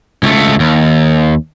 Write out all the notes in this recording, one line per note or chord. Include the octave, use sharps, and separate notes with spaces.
C#2 A3
D#2